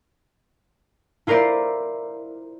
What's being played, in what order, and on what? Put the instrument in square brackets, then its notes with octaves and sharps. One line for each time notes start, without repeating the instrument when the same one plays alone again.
[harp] E4 F4 A#4 C5 D5